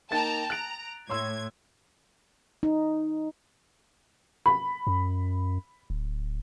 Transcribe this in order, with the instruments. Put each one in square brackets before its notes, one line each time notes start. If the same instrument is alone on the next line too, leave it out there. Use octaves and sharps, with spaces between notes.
[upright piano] A#3 D#4 A6 [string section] G5 A5 A#5
[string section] A#5 [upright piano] F#6 D7
[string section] A2 G#6 [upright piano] C#5 C6 E6
[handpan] D#4
[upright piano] B5
[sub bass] F#2
D1